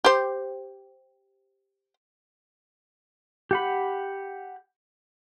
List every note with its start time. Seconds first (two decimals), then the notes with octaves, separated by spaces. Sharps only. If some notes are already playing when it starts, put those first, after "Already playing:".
0.05 G4 C5
3.51 G4 F#5 B5